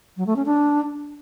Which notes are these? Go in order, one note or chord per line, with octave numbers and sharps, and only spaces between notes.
F#3
A3
C#4
D4